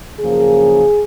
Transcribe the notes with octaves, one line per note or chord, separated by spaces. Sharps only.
F#2 C#3 F3 A#3 G#4